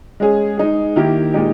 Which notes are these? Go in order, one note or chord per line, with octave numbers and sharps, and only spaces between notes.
G#3 C#4 G#4
G#3 D#4 G#4
D#3 A#3 E4 G4
A#2 G#3 D#4 G4